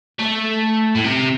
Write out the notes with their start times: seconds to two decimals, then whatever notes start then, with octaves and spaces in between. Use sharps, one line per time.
0.19 A3
0.95 A2
1.04 C3